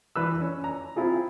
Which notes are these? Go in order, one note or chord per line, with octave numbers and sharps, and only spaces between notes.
E3 B4 E6
C#4
A#5
C4 E4 F4 G#4